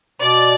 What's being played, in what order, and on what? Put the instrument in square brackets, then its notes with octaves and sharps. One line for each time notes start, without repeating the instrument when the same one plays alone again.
[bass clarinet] B2 [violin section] D5